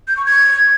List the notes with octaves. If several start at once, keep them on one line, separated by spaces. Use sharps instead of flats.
G6
C#6
G#6